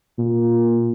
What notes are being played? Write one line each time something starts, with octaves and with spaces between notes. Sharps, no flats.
A#2